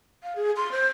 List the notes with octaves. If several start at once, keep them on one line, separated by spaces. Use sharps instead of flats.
F5
G#4
C6
C5